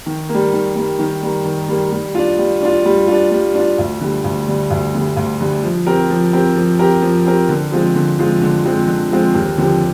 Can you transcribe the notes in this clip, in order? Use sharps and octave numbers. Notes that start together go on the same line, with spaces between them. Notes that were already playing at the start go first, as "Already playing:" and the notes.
D#3
A#3
G3
D#3
G3 A#3
D#3
G3 A#3
D#3
G3 A#3
G3
D4 F4
G3
D4 F4
G3
D4 F4
G3
D4 F4
D2
D3 G3
D2
D3 G3
D2
D3 G3
D2
D3 G3
F3
C4 G4 A#4
F3
C4 G4 A#4
F3
C4 G4 A#4
F3
C4 G4 A#4
D3
F3 G#3 C4 F4
D3
F3 G#3 C4 F4
D3
F3 G#3 C4 F4
D3
F3 G#3 C4 F4
D#2
D3 F3 C4 G4